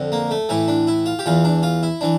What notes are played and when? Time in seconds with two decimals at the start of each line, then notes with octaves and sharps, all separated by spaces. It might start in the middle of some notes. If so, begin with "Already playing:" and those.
Already playing: F2 D3
0.12 A#3
0.31 A3
0.49 A2 E3 E4
0.68 D4
0.87 E4
1.06 F4
1.19 G4
1.26 E2 E3 F4
1.45 D4
1.63 F4
1.83 E4
2.01 E3 D4